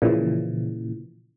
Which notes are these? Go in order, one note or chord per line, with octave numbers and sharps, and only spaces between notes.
A#2 C#3 E3 F3